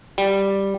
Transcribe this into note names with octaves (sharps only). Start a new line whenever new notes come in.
G3